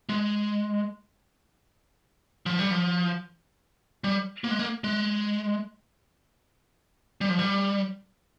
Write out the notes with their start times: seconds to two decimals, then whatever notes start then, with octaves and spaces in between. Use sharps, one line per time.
0.09 G#3
2.46 F3
2.59 G3
2.71 F3
4.04 G3
4.44 A#3
4.51 G#3
4.59 A#3
4.84 G#3
7.21 G3
7.30 F3
7.39 G3